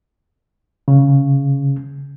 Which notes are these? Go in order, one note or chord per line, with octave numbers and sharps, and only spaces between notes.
C#3